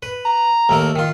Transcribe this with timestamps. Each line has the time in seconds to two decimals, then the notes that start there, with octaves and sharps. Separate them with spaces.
0.03 B4
0.25 A#5
0.69 D#2 A3 A#4
0.96 D#3 F4